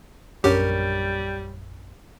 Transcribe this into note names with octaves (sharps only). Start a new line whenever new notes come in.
A#1 F#2 G3 C#4 D4 G4 A#4